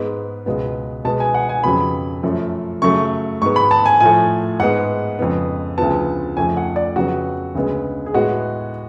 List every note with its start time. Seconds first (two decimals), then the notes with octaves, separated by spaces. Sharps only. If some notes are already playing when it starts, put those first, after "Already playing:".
Already playing: G#2 G#3 B3
0.46 C#2 B2 G#3 B3
1.05 B2 G#3 B3 A5
1.20 G#5
1.34 F#5
1.49 G#5
1.63 F2 C#3 F#3 B3 B5
2.23 F#2 F3 A3
2.82 F#2 C#3 F#3 A3 C#6
3.42 G#2 G#3 B3 C#6
3.56 B5
3.71 A5
3.86 G#5
4.00 A2 F3 A3 G#5
4.60 G#2 G#3 B3 F#5
5.19 F2 C#3 G#3 B3
5.78 D2 C#3 F3 B3 A5
6.37 F2 C#3 F3 A3 G#5
6.57 F#5
6.76 D5
6.96 F2 C#3 F#3 B3 F#4
7.55 D2 C#3 G#3 B3
8.06 G#4
8.14 A2 G#3 B3 F#4